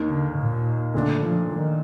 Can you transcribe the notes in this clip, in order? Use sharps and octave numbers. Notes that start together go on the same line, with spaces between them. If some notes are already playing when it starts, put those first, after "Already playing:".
Already playing: D#2 D#3 A#3
D3
A#2
A#2 D3 A3 D4
F3
D#3